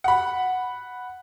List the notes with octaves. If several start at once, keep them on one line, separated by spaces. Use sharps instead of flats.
F#5 B5